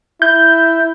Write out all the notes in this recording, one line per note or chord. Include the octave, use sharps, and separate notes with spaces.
E4 G6